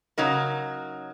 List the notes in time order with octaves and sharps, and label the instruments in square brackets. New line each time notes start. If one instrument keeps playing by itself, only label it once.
[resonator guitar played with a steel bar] C#3 F#3 D#4 A#4